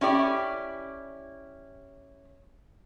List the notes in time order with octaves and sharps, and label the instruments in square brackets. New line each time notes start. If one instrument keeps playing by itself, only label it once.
[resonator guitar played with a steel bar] C#4 E4 G4 D5